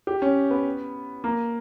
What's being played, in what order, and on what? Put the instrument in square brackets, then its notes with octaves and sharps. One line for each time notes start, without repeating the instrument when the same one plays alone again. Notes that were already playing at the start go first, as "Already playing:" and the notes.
[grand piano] G4
C#4
B3
A#3